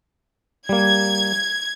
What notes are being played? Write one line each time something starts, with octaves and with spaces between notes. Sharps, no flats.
G3 A#3 G#6